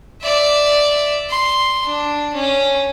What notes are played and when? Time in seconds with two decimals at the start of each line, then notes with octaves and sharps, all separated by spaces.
0.22 D5 E5
1.30 C6
1.85 D4
2.34 C#4